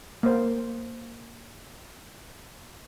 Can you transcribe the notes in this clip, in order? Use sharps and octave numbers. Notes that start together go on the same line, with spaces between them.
A#3 C5